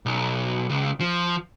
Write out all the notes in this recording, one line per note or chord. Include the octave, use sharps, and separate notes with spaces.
B1
C#2
F3